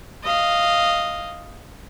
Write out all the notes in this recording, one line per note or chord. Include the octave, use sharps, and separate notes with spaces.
D#5 F5